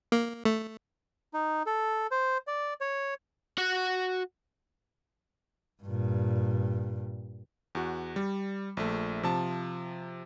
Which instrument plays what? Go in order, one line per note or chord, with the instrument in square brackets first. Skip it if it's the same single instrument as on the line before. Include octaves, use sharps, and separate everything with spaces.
[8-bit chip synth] A#3
A3
[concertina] D#4
A4
C5
D5
C#5
[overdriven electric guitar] F#4 F#5
[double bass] G2 A#2
[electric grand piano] E2 F#4
G3
A#1 A3
C3 F3 A5